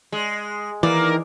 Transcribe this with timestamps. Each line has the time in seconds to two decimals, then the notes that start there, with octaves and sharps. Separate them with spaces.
0.12 G#3
0.83 D#3 E3 A#3 A#4 D5